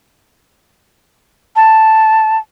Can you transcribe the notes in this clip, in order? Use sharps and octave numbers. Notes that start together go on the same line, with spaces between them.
A5